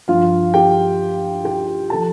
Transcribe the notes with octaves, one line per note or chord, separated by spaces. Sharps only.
G2 F3 F4 F5
G4 G5
G4 G5
F3 A4 A5